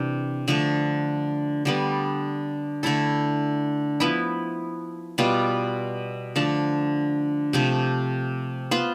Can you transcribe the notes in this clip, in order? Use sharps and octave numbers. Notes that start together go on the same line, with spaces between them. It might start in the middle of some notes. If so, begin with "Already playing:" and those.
Already playing: C3 E3 D4
D3 F3 A3
D3 G3 B3
D3 A3 E4 A4
F3 B3 E4
B2 G3 B3 F4
D3 F3 A3 D4
C3 F3 A3
B3 F4 C5